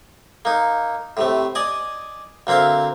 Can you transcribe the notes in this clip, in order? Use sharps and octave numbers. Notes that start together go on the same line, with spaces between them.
A#3 D#4
A2 C3 A3
D5 D#5 G#5
D2 A#3 C4 E5 F5